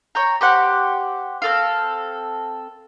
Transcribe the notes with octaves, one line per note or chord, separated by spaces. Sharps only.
C#5 G5 A#5
G4 C5 F#5
C4 A4 F5